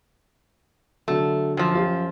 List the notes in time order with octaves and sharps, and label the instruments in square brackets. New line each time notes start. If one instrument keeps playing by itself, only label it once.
[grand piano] D3 F#3 [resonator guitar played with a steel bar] A3
[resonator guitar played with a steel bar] F#2 F3
[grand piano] C#4 F4 G4